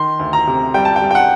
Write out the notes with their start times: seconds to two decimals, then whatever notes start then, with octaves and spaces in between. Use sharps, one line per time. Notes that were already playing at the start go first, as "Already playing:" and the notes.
Already playing: D#3 C6
0.19 D2
0.33 A#5
0.47 C3
0.74 G3 G5
0.85 A5
0.96 G5
1.02 G3
1.11 G5
1.15 F#5